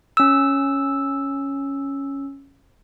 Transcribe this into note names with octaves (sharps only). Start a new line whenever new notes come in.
C#4 E6